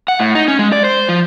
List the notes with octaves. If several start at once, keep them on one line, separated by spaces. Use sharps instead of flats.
F#5
A2
D#4
C#4
G#3
D5
C5
F3